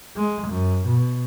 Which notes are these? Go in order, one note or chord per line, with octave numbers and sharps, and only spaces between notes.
G#3
F#2
B2